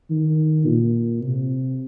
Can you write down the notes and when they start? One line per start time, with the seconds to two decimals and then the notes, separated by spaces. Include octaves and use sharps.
0.11 D#3
0.66 A#2
1.22 C3